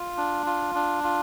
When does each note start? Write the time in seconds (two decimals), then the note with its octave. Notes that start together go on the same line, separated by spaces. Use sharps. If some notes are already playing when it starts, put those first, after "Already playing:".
Already playing: F4
0.17 D4
0.46 F4
0.75 D4
1.04 F4